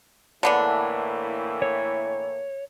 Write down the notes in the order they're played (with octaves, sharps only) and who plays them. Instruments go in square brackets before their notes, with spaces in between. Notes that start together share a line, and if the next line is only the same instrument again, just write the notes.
[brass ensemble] A2 E3 A#3 [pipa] D3 B3 D4
[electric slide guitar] C#5